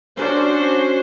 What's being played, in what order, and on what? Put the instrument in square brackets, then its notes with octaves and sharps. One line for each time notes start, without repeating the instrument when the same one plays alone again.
[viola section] C#4 D4 F#4 C5